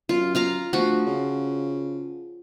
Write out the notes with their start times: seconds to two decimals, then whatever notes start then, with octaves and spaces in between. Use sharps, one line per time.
0.09 F#2 F4
0.35 F4 F5 A#5
0.73 D2 F3 F#4
1.06 C#3